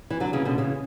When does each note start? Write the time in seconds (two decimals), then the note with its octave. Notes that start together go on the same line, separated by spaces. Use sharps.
0.10 E3
0.20 D3 F#3
0.33 C#3 E3
0.45 B2 D3
0.58 C#3 E3